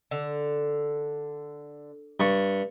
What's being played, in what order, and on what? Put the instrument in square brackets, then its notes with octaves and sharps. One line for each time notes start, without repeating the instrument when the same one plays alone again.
[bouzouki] D3
[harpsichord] G2 C#6